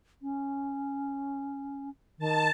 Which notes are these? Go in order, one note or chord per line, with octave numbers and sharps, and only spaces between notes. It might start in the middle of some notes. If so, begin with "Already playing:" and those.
C#4
D#3 A5